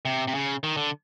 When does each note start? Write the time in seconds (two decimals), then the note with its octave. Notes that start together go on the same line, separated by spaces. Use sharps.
0.05 C3
0.27 C3
0.35 C#3
0.63 D#3
0.77 D3